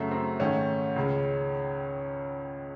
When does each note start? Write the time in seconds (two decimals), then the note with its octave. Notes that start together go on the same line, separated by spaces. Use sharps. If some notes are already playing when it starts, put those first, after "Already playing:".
Already playing: F#2 C#3 F#3 A3
0.11 C4
0.40 G#2 D#3 A3 C#4
0.96 C#2 C#3 G#3